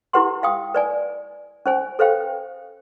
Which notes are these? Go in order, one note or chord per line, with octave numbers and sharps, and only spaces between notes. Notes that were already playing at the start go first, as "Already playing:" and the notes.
E4 G4 B4 F#5 C6
F5 G5 D#6
B4 D5 G#5
C#4 C5 G#5
A4 B4 C5 F5 G5